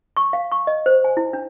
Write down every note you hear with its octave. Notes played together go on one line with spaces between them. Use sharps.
C#6
F5
C#6
D#5
C5
G#5
E4
D4